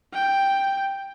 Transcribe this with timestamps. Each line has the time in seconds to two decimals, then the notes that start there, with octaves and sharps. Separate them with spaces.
0.14 G5